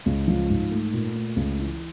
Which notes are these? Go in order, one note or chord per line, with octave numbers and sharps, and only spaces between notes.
C#2
F3
G#2
A3
A#2
A3
C#2
E3